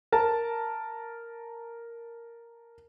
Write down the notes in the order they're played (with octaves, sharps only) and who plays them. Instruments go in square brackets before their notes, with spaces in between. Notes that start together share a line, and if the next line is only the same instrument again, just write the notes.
[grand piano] A#4 A5